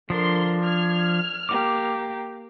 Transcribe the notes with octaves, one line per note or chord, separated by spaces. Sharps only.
D3 F3 D4 A#4 C6
F6 G#6
A#3 G4 D6